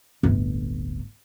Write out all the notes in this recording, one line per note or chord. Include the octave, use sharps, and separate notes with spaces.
D1 G1